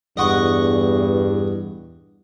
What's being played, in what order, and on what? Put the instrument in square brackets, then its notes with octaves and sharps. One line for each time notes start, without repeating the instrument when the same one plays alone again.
[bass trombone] E2 [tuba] G2 [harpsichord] D#5 F#5 C#6